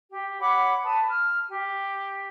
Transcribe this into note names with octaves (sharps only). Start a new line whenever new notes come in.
G4
C#5 F#5 B5 D6
B4 A5 D#6
F6
G4